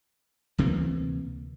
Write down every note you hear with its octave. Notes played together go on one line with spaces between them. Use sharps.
D2 C3 E3 A#3